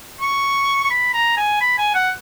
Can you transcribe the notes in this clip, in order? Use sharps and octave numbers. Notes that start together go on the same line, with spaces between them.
C#6
C#6
B5
A#5
G#5
B5
G#5
F#5